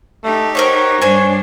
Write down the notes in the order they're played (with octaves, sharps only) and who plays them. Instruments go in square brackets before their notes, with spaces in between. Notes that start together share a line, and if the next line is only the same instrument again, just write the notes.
[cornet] A3 [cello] D#4 G4
[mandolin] A#4 C5 F#5 [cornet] C#5
[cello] G2 D4 [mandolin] C5 G#5